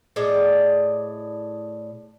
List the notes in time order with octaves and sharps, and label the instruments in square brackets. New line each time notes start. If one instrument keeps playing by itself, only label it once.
[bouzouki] A2 G#4 D5 D#5